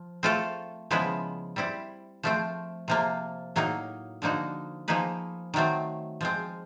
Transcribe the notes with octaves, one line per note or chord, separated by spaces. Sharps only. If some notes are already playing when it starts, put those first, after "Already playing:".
Already playing: F3
A3 C4 F4 A4
C#3 F3 G#3 B3 E4
G3 C4 E4
F3 A3 C4
C3 F3 A#3
A2 F#3 A#3 D#4
D3 F3 A#3 D#4 F#4
F3 A#3 D#4 G#4 B4
D#3 F#3 A3 C4
F3 G#3 C4